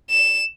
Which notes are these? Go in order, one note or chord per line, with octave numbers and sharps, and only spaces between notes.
E7